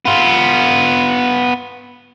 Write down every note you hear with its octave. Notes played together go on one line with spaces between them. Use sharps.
B3 F4